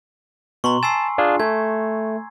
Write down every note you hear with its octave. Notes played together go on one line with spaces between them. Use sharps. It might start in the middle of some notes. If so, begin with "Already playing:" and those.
B2 A#5 C6 C#6
G#5 A5 E6 C7
D4 F4 G#4
A3 G#6